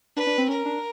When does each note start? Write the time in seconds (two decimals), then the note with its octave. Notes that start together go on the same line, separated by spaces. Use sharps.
0.16 D4 B4
0.27 D4
0.38 C4
0.49 C#4 A#4
0.65 D4